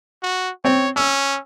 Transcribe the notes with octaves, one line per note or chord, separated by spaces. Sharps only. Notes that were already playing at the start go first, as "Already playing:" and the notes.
F#4
C4 C#5
C#4 E6